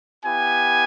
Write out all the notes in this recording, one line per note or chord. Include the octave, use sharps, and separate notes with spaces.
B3 E4 G4 G#5